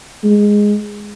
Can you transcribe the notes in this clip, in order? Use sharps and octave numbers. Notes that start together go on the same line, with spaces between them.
G#3